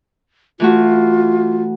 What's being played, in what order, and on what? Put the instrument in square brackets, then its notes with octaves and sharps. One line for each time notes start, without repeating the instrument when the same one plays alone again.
[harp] E3 A3 F#4 [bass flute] F4